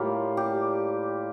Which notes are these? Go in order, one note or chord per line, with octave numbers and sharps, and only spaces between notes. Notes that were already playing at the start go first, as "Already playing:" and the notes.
Already playing: A2 G3 A#3 F4
G4